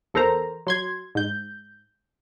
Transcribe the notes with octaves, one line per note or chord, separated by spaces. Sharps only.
E2 A4 A#4 C5 A#5
F#3 C6 G#6
G#2 G6